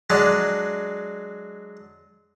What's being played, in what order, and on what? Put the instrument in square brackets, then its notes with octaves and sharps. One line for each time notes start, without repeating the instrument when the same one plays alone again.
[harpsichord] F#3 G#3 D4